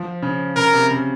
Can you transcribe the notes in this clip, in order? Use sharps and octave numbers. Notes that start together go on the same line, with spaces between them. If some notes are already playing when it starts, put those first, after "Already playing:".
Already playing: F3
C#3
C#3 A#4
C3
C#3